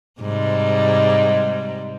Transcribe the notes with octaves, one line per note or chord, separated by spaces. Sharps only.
G#2 C3 G3